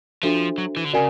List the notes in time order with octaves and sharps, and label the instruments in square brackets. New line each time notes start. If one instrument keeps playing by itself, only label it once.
[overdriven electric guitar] F3 [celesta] D4 F#4 A4 C5 E5
[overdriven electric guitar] F#3
E3
D3
[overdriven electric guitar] C#3 [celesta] F#4 A#4 D5 F5 G#5